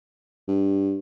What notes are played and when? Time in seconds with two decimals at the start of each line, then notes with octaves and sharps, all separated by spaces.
0.48 G2